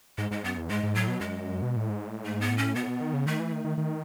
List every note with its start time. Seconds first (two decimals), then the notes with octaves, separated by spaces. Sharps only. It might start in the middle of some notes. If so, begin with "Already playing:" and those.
0.18 G#2 G#3
0.31 G#2 G#3
0.44 F#2 B3
0.57 E2
0.70 G#2 G#3
0.83 G#2
0.95 A2 F#3
1.08 B2
1.21 F#2 G#3
1.62 B2
1.76 A2
1.90 G#2
2.07 A2
2.24 G#2 A3
2.41 B3
2.50 A2
2.58 C#4
2.75 B2 B3
2.83 A2
2.88 B2
3.01 D#3
3.14 C#3
3.26 D#3 A3
3.40 E3
3.52 D#3
3.65 D#3
3.77 D#3